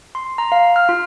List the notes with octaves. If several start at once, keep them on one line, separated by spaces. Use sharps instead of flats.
C6
A#5
F5
F6
F4